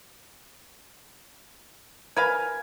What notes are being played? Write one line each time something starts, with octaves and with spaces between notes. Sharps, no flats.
A#4 B4 F5 G#5